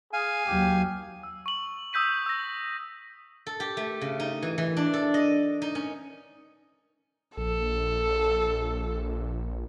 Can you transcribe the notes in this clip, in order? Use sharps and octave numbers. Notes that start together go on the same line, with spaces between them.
G#4 F5 G#5
D#2 F#3 G4
E6
C#6 F#7
D#6 E6 G6 B6 D#7
E6 A#6
A4
G4
A3
C#3
D#4
E3
E3
D4
A4
D#5
D#4
C#4
A#1 A4